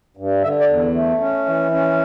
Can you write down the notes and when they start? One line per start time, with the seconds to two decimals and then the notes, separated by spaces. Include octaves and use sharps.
0.17 G2
0.43 D3 E5
0.60 D5
0.69 E2
0.94 A3
1.20 C#4
1.46 E3
1.71 C#4